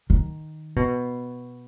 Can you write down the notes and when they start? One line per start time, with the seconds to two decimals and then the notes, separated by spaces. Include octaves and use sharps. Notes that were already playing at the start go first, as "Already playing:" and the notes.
0.10 D#3
0.76 B2